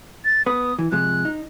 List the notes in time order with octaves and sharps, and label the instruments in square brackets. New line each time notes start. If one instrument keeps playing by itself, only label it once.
[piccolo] A6
[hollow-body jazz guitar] B3 B4 [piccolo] D#6
[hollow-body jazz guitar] E3
[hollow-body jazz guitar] C3 F3 G#3 [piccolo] F#6
[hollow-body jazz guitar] D#4